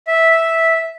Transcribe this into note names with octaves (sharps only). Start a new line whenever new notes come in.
E5